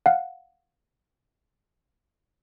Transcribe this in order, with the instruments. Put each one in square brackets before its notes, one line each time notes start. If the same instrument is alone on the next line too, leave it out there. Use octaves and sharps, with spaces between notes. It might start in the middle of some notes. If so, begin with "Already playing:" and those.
[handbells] F5 F#5